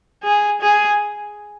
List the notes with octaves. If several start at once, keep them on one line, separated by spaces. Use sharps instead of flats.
G#4
G#4